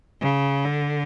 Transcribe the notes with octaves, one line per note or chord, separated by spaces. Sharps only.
C#3
D3